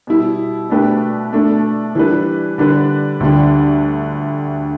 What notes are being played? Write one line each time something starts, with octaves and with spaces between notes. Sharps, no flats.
B2 G3 E4
B2 A3 D4 G4 B4
B2 A3 D4 A4
E3 G3 D4 B4
D3 G3 D4 B4
D2 D3 G3 D4 G4